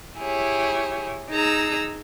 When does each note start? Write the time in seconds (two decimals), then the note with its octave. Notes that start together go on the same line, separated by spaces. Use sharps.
0.18 E4 G4 G#4 C#5
1.31 D#4 G#4 A#5 E6